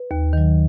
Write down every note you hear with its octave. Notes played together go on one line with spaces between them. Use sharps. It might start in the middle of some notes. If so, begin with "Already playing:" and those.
Already playing: B4
D#2
D#3 F#3